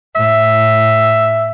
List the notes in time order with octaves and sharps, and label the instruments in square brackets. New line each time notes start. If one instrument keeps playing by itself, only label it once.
[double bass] A2 [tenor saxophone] E5